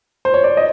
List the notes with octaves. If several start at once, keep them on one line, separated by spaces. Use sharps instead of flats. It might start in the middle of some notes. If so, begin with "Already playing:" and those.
C5
C#5
D5
D#5